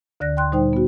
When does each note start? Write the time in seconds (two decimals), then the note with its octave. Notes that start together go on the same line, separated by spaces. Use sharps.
0.20 D2 D3 D5 F#6 A#6
0.37 G5 C6 F#6
0.52 A#2 G3 D#4 C5 G5
0.73 B3 F#4